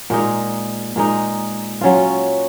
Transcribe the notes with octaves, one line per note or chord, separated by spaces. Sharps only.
A#2 G#3 D#4
A#2 G#3 D#4
F#3 C#4 F4